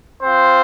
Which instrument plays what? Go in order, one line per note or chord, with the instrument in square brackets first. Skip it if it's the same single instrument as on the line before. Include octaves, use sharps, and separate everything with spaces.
[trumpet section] C4 F4 C5